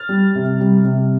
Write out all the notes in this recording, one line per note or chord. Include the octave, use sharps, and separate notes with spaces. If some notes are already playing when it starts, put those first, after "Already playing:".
Already playing: F6 A6
G3
C3
G3
C3